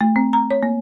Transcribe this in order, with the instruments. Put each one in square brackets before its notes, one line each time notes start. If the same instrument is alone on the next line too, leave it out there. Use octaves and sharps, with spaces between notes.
[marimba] A3
C4
A#5
C#5
A#3